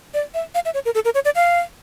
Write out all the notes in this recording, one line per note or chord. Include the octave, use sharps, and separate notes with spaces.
D5
E5
F5
E5
C#5
A#4
A4
A#4
C#5
D5
F5